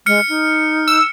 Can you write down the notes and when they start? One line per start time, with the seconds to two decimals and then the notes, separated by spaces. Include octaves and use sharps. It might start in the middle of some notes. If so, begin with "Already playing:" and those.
0.06 G#3 F6 C#7
0.29 D#4
0.88 E6